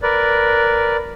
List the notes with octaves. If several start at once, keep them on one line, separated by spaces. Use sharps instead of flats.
A#4 B4 D5